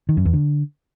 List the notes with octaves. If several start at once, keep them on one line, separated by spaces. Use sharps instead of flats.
D#3
F#2
E2
D3